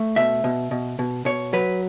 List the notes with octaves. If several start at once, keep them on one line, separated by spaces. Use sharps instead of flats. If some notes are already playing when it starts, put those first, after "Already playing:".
Already playing: A3
B2 E5
B2
B2
B2
B2 C#5
F#3 B4